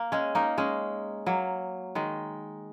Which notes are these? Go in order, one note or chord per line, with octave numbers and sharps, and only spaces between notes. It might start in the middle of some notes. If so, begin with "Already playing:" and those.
Already playing: A#3
G#3 C#4
A#3 D#4
G#3 C#4
F#3 A#3
D#3 G#3